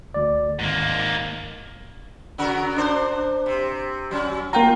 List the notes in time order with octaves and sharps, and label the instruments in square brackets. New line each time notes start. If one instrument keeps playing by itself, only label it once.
[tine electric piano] D2 D5
[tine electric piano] G#1 [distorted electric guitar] G#2 A#3
[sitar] C#3 F#4 A#4
D4 C5
C3
F#3 C#4
[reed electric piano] A#3 G5 A#5 [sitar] F4